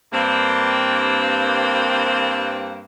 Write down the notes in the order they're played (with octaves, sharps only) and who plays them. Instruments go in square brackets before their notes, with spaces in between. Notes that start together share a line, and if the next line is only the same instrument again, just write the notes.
[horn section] G2 A#3 C4